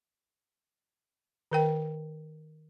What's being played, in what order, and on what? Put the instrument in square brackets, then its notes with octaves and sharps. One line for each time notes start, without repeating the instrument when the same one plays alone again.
[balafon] D#3 A#4 G5